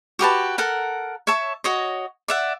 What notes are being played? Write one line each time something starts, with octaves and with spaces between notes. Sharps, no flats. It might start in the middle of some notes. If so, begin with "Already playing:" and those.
F#4 G4 B4 A5
A4 A#4 F#5 A#5
C#5 E5 A5 C#6
F#4 C#5 D#5
D5 E5 F#5